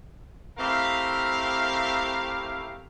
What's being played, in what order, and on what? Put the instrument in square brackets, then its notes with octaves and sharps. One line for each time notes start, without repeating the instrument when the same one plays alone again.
[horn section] A3 C4 E4 G4 A#4 F5